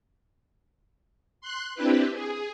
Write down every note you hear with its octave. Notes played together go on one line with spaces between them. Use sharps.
C6 F#6
C4 D4 E4 G4 B4
G#4